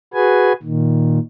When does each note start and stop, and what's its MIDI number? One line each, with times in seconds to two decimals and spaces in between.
0.14 0.53 66
0.14 0.53 68
0.14 0.53 71
0.14 0.53 80
0.63 1.19 46
0.63 1.19 51